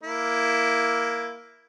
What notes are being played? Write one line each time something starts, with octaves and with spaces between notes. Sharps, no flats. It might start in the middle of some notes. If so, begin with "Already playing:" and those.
A#3 E4